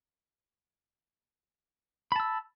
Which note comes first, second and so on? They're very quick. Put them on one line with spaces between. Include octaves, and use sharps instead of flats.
B5 A5 E6